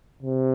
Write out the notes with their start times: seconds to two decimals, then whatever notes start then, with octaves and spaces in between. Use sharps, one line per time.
0.23 C3